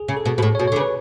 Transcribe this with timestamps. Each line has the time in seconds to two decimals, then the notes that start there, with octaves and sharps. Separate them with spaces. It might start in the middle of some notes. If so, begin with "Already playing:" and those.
Already playing: G#4
0.08 C#3
0.17 A4
0.25 B2
0.38 B2
0.42 A2
0.55 C#5
0.59 B2
0.68 D3 C#5
0.76 C#3
0.81 B4